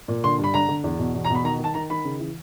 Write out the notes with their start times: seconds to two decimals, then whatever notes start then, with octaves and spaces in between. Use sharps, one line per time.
0.08 A#2
0.24 D3 C6
0.38 G2
0.44 B5
0.54 D3 A#5
0.68 D3
0.84 E2
0.99 B2
1.15 E2
1.25 A#5
1.30 B2
1.35 B5
1.44 D#3 A#5
1.59 D#3 A5
1.74 D#3 A#5
1.90 D#3 B5
2.05 C#3
2.19 E3